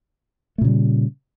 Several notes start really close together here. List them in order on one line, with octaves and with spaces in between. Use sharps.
A3 A#2 C#3 G3